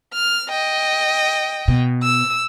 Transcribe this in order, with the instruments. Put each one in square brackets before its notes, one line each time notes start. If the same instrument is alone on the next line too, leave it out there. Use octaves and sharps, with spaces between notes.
[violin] F6
D#5 G5
[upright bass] B2
[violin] E6